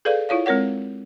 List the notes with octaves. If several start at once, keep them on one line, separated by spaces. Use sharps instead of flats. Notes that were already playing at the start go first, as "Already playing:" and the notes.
G#4 A4 B4 D5 F5
E4 F4 C#5 F5
G#3 C4 A#4 C#5 F#5